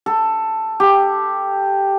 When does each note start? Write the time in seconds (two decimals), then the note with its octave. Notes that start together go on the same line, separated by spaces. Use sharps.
0.06 A4
0.80 G4